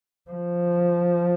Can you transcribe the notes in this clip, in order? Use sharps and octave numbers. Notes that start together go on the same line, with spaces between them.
F3